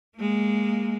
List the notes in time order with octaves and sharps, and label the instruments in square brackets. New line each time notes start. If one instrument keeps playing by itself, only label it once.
[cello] G#3 A#3